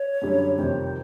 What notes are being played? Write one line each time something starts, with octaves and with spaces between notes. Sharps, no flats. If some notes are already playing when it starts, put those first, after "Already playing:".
Already playing: C#5
F#2 D3 G3
F2 C3 D#3 G3 C5